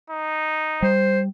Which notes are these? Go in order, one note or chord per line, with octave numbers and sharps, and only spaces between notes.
D#4
G3 C5